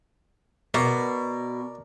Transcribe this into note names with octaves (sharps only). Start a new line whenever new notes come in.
B2 A#4 D5